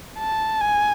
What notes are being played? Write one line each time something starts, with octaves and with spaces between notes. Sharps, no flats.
A5
G#5